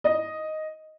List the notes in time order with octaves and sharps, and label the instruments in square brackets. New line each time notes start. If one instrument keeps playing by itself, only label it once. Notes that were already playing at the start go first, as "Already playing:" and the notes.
[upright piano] D#5